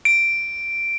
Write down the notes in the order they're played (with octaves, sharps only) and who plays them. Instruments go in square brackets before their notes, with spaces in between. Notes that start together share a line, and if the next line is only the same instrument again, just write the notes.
[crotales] D7